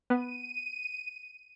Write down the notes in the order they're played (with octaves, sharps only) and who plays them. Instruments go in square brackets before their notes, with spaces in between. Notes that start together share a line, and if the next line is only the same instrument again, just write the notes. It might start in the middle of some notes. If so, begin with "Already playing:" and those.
[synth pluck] B3 [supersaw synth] D#7